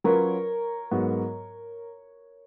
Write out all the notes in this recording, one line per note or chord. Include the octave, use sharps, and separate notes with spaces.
F#3 C#4 F4 A#4 B4 C#5
G#2 F#3 B3 F#4